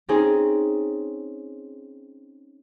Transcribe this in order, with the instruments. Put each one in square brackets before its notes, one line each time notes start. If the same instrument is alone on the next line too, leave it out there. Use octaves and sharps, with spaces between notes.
[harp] C4 C#4 D#4 G#4